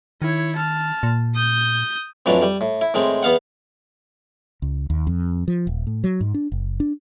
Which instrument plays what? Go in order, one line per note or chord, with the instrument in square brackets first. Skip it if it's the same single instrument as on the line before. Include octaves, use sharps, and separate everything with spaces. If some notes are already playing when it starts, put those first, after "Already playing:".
[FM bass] D#3 [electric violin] E4 C#5
[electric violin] A5 F6
[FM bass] A#2
[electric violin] D#6 G6
[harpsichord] F2 A2 E3 F#3 D4
G3
A2
E4
A2 D#3 G#3 C4
E2 B3 F5 F#5
[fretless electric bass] C#2
D#2
F2
F3
D#1
A2
F#3
G#2
D4
F#1
D4